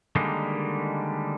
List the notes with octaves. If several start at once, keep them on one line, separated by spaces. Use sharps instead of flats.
D3 D#3 G3 G#3 A#3 D#4